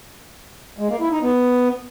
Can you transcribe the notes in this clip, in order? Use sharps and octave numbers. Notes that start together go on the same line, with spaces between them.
G#3
A#3
E4
D#4
B3